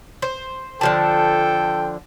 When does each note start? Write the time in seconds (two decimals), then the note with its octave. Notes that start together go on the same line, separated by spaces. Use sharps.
0.22 C5
0.81 D3 F3 A4 G5 A5